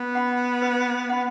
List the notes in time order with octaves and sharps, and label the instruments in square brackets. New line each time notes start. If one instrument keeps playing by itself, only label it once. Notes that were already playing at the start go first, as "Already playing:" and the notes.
Already playing: [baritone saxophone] B3
[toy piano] F#5 B5
B4
F#5 B5